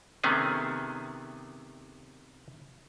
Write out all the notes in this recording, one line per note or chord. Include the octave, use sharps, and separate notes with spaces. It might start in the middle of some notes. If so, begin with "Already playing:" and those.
C3 D#3 A3 B3 C#4 G#4